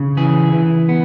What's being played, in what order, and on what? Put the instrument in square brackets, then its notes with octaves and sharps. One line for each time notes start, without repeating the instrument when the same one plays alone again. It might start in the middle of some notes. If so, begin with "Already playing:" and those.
Already playing: [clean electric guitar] C#3
E3 G#4
E3
B3